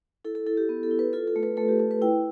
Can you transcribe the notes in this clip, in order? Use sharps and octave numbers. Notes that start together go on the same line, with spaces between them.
E4 A4
A4
E4 A4
G4
B3
A4
E4
B4
F4 A4
A4
A3
B4
A3 A4
G4
A3 A4
B4
E4 G5